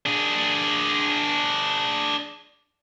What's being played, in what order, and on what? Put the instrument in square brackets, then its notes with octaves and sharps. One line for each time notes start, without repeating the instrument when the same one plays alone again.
[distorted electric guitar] D4 G#4